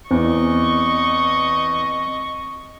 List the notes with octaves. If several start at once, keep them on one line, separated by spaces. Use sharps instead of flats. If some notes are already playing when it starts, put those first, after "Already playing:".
E2 C4 D#5 C#6